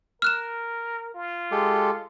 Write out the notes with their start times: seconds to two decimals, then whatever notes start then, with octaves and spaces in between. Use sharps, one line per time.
0.22 A#4 F6 F#6 E7
1.14 F4
1.51 G#3 G4 A4